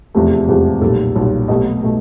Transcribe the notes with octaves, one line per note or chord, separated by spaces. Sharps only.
F1 E2 C3 F3 A3 G#4
F1 E2 C3 F3 A3
B1 A#2 G3 A4
B1 A#2 G3
C2 B2 F#3 A3 D#5
B2 F#3 A3